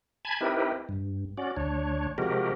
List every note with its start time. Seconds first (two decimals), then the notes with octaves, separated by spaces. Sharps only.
0.25 G#5 A5 B5 G#6
0.41 C4 D#4 E4 G4 A#4 B4
0.89 G2
1.38 C#4 F#4 D5
1.56 D2 D4 C#5
2.18 C3 F3 G#3 F#4 G4 A#4